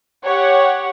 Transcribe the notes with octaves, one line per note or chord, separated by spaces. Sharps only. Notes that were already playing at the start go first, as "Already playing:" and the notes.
G4 C#5 F#5